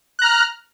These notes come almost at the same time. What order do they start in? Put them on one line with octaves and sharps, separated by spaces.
F#6 A#5 F6